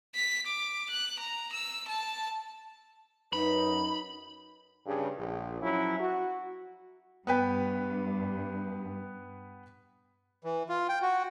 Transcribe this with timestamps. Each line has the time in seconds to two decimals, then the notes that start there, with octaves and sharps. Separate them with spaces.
0.15 B6
0.46 D6
0.90 F#6
1.20 A#5
1.53 E6
1.88 A5
3.33 F#2 D#4 B4 B5
4.86 G2 C#3
5.18 A#1
5.61 F3 F#3 C#4 E4
6.00 F#4
7.27 G2 B3 B4 G5
10.44 E3
10.69 F4
10.89 G5
11.02 F#4